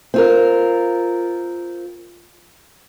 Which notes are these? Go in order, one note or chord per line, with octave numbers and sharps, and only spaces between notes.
C4 F4 A#4